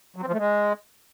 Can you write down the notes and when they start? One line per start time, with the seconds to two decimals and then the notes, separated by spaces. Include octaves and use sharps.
0.16 F#3
0.22 C4
0.27 F3
0.33 A3
0.38 G#3